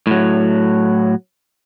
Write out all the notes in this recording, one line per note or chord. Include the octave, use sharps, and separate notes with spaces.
A2 F#3